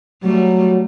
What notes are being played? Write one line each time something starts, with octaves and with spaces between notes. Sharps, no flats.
F#3 G3 A3